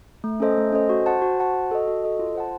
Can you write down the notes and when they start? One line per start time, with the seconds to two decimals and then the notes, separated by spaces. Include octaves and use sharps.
0.24 A3
0.40 C#4 A4 C5 D#5
0.57 A3
0.73 C#4 A4 C5 D#5
0.89 F#4
1.06 C5 F#5 A5
1.22 F#4
1.39 C5 F#5 A5
1.54 F#4
1.71 A4 D#5
1.88 F#4
2.04 A4 D#5
2.19 F4
2.35 C5 F#5 A5